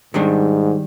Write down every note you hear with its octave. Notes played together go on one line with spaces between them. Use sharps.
G#2 D#3 G3 D4